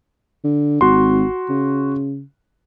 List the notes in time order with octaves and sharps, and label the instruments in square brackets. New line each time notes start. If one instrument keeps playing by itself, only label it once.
[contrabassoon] D3
[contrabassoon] G#1 [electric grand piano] F#4 C6
[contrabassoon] C#3